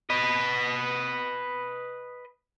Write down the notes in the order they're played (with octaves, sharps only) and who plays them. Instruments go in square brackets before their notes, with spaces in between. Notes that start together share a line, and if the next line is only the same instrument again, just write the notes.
[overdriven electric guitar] B4 D#5